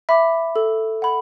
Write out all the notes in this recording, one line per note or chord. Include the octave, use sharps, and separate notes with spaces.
E5 B5 D6
A4
F#5 B5